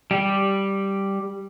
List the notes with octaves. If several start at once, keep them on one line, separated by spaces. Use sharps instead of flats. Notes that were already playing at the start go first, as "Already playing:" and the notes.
G3 G4